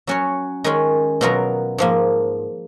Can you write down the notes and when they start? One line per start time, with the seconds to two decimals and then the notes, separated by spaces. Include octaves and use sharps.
0.07 F#3 C#4 F#4 C#5
0.64 D#3 G#3 C#4 G#4
1.21 B2 F#3 B3 F4 A#4
1.78 G#2 F3 A#3